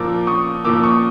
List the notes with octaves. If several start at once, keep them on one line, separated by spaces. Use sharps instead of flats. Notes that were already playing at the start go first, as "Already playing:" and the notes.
Already playing: A#2 F3 A#3 D6 E6
C#6 D#6
A#2 F3 A#3 D6 E6
C#6 D#6